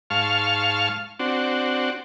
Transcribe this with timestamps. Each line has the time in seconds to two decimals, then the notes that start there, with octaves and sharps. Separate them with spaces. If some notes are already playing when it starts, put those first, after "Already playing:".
0.10 G#2 F5 A5 C#6 F6
1.19 C4 D4 F#4